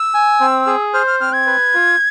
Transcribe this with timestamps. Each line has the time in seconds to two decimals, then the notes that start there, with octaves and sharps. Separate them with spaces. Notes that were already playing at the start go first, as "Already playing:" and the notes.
Already playing: E6
0.14 G#5
0.40 C4
0.66 G#4
0.94 C5 F6
1.07 F6
1.20 C4 F6
1.33 G#6
1.47 B4
1.74 F4